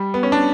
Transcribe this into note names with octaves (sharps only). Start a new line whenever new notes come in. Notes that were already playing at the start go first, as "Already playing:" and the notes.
Already playing: G3
B3
C#4
D4